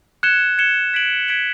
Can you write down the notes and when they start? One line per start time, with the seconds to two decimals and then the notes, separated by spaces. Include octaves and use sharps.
0.23 F#6 G#6 C#7 E7 G7
0.58 G#6 C#7 E7 G7
0.93 G#6 B6 D7 F#7
1.28 G#6 B6 D7 F#7